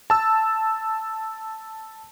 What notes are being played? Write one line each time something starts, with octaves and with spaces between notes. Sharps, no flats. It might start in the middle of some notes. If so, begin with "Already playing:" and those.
A5 E6